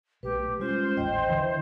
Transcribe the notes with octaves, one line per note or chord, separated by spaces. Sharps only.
B1 A3 G4 B4
G3 G#3 C#4 F4 C5
A1 D#2 D#5 G5
D3 E3